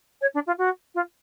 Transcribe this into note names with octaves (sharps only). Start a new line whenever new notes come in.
C#5
D4
F4
F#4
F4